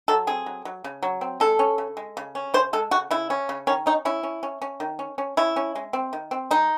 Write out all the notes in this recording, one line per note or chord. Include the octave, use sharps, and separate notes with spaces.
F#3 A4
C4 G#4
F#3
F#3
C#3
F#3
C4
G#3 A4
C#4
C#3
G#3
C#3
C#4
C#3 C5
G#3 A4
C#3 F#4
C#3 E4
C#4
C#3
D#3 C#4
C#4 D#4
C#4 E4
C#4
C#4
C#4
D#3
C#4
C#4
C#4 E4
C#4
G#3
C4
D#3
C4
G#3 D#4